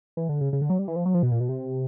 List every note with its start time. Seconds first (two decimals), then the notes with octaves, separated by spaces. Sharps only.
0.17 E3
0.29 D3
0.41 C#3
0.53 C#3
0.62 D3
0.70 F#3
0.79 G3
0.88 E3
0.96 F3
1.06 F#3
1.14 F3
1.23 B2
1.31 A#2
1.40 B2
1.49 C3